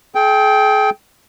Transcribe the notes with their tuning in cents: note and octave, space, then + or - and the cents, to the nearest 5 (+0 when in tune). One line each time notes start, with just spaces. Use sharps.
G#4 +45 G5 +0